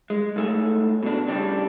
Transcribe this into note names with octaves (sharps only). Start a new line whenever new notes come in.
G#3
G#2 A3 G#5
B2 D4
C#3 G3 D4